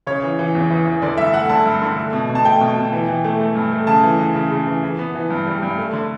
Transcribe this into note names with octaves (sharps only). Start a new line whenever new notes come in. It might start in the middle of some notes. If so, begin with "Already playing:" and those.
C#3 C#5
E3
E3
E2
E3
E3
D3 D5
G2 E5
A3 F#5
D3 A5
G2
D3
A3
B2
B2
A5
A3 G5
B2
B2
E3
E3
A3
A3
G2
A3
C#3 A5
E3
E3
C#3
C#3
E3
E3
B3
E3
G2
G3
G2
A3
D3